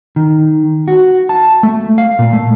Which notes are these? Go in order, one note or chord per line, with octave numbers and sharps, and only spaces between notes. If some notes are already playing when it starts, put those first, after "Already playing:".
D#3
F#4
A5
A3
F5
A#2
A3